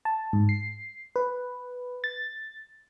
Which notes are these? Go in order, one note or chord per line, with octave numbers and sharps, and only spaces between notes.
A5
G#2
C7
B4
A6